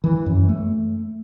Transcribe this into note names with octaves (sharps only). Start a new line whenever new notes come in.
E3
F#2
A3